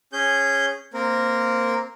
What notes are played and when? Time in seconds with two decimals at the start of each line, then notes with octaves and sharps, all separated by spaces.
0.13 C#4 G#4 G6
0.93 A#3 C4 A#4